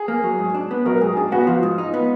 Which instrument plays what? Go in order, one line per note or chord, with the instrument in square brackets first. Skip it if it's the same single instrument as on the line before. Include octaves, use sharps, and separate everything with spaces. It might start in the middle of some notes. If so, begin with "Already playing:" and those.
Already playing: [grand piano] G#4
[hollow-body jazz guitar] A#3
F#3
G#2
D4
B3
[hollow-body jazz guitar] F#3 [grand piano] A#4
[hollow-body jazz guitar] G#2 [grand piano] G#4
[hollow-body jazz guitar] D4 [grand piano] G#4
[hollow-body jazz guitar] B3 [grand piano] F#4
[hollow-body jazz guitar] F3 [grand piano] F4
[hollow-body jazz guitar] G#2
D#4
B3